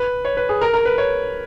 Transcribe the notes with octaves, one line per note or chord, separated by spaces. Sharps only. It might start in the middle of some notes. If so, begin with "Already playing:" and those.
Already playing: B4
C#5
B4
G#4
A#4
A#4
B4
C#5